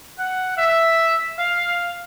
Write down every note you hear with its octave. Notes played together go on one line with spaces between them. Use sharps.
F#5
E5
F5